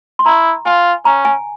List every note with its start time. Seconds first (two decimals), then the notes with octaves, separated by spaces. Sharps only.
0.19 C6
0.26 E4 A#5
0.65 F4 G#5
1.05 C#4 A#5
1.25 G#5